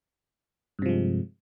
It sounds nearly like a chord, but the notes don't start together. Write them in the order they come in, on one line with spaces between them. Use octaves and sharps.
G2 C3 F3 G#3